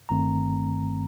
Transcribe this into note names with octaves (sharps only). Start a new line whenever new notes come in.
G1 G2 D#3 A3 C4 A#5